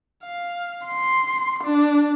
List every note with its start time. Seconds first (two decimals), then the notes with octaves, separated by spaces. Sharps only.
0.24 F5
0.87 C6
1.64 D4